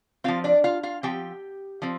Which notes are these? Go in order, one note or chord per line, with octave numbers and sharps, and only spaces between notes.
F3 C4 F4 F5
D4 D5
F4 F5
F4 F5
F3 C4 G4 G5
F3 C4